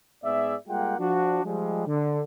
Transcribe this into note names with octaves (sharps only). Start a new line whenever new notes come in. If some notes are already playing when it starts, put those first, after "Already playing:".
G#2 B3 G#4 D5 E5
G3 G#3 A#3 F4 F#5 G5
F3 D4 F#4
F3 G3 G#3
D3